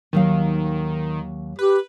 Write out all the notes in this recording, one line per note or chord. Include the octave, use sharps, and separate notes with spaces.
D#2 D#3 F#3 F5
G4 B4